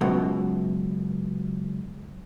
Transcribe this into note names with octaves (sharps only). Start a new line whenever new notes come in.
C#2 F#2 B2